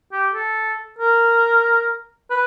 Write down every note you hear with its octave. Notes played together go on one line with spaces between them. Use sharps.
G4
A4
A#4
B4